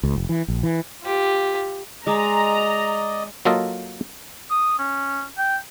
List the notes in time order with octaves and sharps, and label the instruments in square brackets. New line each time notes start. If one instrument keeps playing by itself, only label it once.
[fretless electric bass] C#2
F1
E3
A#1
E3
[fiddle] F4 G4
[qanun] G#3 [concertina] D5 D#5 [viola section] A#5
[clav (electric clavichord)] F#3 A#3 F4 A4 D#5
[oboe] D#6
C#4
G5